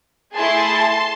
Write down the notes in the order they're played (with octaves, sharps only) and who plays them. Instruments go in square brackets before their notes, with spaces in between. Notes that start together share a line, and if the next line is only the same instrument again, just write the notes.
[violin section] A3 E4 G#4 A5 C6